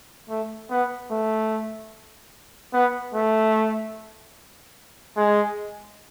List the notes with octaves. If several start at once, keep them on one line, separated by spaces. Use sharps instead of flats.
A3
B3
A3
B3
A3
G#3